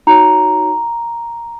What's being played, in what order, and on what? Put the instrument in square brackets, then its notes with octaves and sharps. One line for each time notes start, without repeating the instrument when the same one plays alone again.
[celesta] D#4 F#4 C#5 A#5